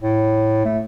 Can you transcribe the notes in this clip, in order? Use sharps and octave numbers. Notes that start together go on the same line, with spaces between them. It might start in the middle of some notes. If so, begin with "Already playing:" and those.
A2
A3